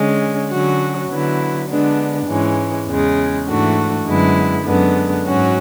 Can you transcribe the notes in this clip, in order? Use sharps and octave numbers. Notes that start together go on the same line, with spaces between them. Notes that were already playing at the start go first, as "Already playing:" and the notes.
Already playing: D3 G#3 C#4
D3 F#3 C#4 F#4
D3 F#3 B3 E4
D3 G#3 B3 D4
G#2 E3 G#3 C#4
E2 C#3 G#3
G#2 E3 A3 D4 F#4
F#2 D3 G#3 B3 E4
F#2 D3 G#3 B3
G#2 F#3 C#4 F#4